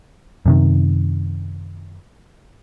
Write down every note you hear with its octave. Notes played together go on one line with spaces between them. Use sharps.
F#2 C3 D#3